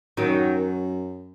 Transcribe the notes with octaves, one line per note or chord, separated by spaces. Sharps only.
F#2 D#3 F#3